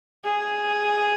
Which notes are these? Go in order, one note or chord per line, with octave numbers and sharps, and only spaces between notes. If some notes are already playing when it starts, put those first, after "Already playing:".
G#4